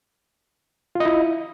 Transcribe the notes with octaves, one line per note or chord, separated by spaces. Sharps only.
E4 F4 D#5